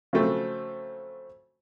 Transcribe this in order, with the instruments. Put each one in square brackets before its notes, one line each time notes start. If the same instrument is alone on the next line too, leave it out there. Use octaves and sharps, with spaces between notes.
[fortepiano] C#3 F3 F#3 A3 C4